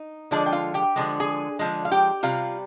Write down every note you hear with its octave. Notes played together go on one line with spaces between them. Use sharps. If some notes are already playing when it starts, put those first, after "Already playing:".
Already playing: D#4
D3 F3 G#3 D4 D5
G5
F4 F5
G4 G5
D3 F3 G#3
G#4 G#5
D3 F3 G#3
F5
G4 G5
C3 G3 F4 F5